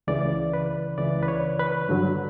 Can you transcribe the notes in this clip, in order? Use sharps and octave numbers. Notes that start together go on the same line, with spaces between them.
C#2 C#3 E3 D5
B4
C#2 C#3 E3 D5
B4
C#5
B4
G2 D3 F#3